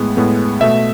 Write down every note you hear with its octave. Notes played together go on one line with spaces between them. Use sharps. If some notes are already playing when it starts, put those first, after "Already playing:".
Already playing: A2 G#3 B3
A2 G#3 B3
B2 A3 E5